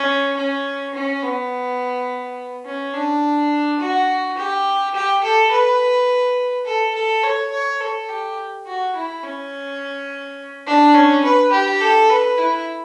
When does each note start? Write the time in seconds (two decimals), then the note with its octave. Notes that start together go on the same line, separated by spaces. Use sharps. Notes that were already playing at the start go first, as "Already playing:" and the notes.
Already playing: C#4
0.37 C#4
0.95 C#4
1.23 B3
2.66 C#4
2.94 D4
3.80 F#4
4.37 G4
4.95 G4
5.24 A4
5.51 B4
6.66 A4
6.95 A4
7.23 C#5
7.52 C#5
7.81 A4
8.09 G4
8.67 F#4
8.95 E4
9.24 C#4
10.67 D4
10.95 C#4
11.24 B4
11.52 G4
11.81 A4
12.10 B4
12.38 E4